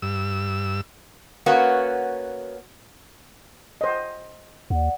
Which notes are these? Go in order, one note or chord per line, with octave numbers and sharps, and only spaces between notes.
G2 E6
A#3 B3 C#4 F#4
C5 D#5
D#2 D5 F#5